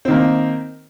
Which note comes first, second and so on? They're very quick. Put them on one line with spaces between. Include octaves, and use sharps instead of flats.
C4 D#3 A#3